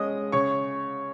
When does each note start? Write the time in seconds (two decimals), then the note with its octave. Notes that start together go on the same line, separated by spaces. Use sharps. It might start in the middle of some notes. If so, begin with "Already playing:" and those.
Already playing: G#3 C#4 D#5 D#6
0.32 C#3 C#5 C#6